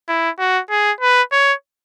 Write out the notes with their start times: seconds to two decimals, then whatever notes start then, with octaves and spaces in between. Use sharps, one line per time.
0.08 E4
0.39 F#4
0.70 G#4
1.01 B4
1.32 C#5